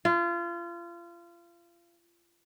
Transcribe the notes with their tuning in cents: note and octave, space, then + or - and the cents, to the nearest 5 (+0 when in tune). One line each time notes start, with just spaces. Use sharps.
F4 -30